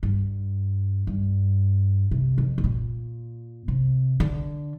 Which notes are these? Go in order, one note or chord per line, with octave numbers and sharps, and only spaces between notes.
G2
G2
C3
F2
G2
A#2
C3
D3